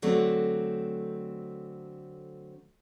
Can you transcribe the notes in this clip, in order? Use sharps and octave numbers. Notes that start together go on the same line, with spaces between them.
D3 F#3 A3 C4